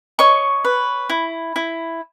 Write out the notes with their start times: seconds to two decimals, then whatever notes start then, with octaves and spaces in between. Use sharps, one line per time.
0.19 C#5 D#5 C#6
0.65 B4
1.09 E4
1.56 E4